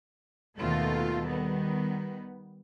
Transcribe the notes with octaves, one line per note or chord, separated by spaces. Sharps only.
D#2 B2 D#3 A3 F4 A4
D#3 G3 B3